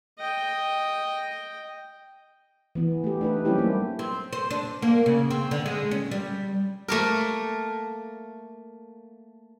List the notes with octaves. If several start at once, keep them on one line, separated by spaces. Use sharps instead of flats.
D#5 G5
E3 B3
A3 G4
D4 D#4 B4
F#3 G3 C4 C#4 E4 G4
A#3
C4
C5
D4
A#3
C#3
C4
D3
G#3
C#4
G3
A3 A#3 A#4